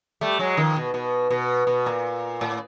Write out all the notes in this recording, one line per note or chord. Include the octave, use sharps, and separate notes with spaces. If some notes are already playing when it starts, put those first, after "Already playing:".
G3 A3
F#3 G#3
D#3 F3
B2
B2
B2
B2
A#2
A2